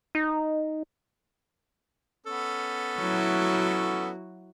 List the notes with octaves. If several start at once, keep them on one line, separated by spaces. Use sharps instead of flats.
D#4
B3 C#4 A4
F#3 E4 F#4